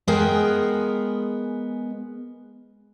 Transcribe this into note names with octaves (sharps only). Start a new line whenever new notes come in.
G#3 B3 G#4 A#4 G5